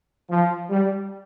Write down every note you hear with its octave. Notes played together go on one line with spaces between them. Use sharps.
F3
G3